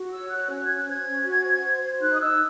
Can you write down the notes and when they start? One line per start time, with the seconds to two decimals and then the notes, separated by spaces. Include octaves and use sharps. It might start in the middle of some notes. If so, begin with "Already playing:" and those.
Already playing: F#4
0.11 C#5 E6
0.30 F#4 F#6
0.49 C#4
0.63 C#4 G#6
0.76 F#6
0.87 C5 G#6
1.06 C#4
1.25 F#4
1.44 C5
1.63 C5
1.82 C5
2.01 D#4 F#6
2.13 D#6
2.20 D#4 E6